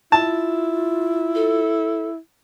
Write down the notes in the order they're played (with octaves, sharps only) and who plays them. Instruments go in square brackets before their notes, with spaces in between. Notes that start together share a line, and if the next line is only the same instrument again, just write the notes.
[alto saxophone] E4 [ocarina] F4 [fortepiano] A5
[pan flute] A4